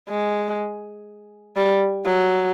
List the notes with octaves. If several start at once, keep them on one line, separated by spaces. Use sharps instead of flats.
G#3
G3
F#3